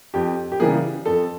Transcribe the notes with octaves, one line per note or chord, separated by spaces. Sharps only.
F2 G4
G4
C#3 E3 G3 A#3 G#4
F2 A4